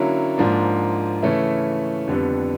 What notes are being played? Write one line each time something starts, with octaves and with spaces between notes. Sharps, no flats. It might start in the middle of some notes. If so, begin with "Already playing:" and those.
Already playing: D3 F#3 A#3 C#4 E4
G#2 F3 A#3 D4
C#3 E3 A3 C#4 E4
F2 D3 G3 B3